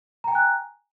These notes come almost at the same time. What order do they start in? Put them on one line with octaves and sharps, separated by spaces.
A#5 G5 G#5 F#6